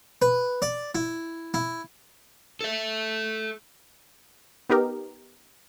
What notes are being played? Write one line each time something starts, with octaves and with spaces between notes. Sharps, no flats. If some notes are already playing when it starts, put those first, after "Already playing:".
B4
D5
E4
E4
A4 E5
B3 D#4 G4 A#4